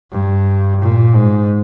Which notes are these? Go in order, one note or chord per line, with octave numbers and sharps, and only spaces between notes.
G2
A#2
G#2